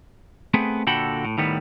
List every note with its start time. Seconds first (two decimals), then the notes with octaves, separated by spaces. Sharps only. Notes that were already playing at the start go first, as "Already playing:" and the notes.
0.54 A3 B3 C4 G#4 B4
0.87 A#2 D3 F#4 A4 G5 B5
1.25 A2
1.38 A2 D#3 G3 B3